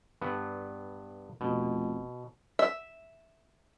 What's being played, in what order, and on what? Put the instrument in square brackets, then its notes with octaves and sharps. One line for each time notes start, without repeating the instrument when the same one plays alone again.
[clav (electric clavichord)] G2 B3
[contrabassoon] F1 [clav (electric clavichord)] B2
[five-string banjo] E5